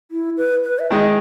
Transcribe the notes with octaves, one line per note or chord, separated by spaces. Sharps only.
E4
B4
B4
E5
D#3 G#3 D#4 D#5